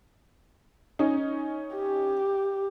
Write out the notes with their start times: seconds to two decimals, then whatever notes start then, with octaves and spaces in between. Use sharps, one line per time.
0.99 C#4 D#4
1.75 G4